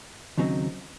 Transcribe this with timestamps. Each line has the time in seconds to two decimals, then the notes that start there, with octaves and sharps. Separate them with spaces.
0.38 D#2 C#3 F#3 C4 D#4